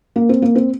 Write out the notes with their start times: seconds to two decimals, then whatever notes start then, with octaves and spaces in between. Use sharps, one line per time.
0.16 A#3
0.29 C4
0.42 A#3
0.55 C4